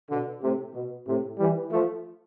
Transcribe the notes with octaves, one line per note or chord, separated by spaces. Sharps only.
B2 D3
A2 C3
B2
A2 C3
E3 G3
F3 A3